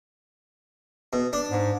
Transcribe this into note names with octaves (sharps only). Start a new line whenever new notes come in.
B2
D4
G#2